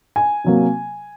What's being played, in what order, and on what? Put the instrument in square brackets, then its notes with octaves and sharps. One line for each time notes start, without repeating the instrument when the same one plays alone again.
[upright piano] G#5
C3 F#3 A#3